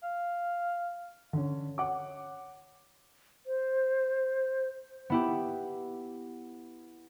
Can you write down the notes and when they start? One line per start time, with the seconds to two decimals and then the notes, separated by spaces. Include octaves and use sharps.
0.03 F5
1.33 D3 C#4
1.78 C#5 F#5 D6
3.46 C5
5.10 B3 E4 G4